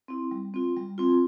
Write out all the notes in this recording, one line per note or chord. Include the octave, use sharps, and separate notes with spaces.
C4 E4
G3
C4 F4
G3
C4 F4